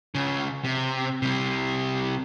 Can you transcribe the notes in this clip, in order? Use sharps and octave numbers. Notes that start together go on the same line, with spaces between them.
C#2 C#3
C3
C3 G3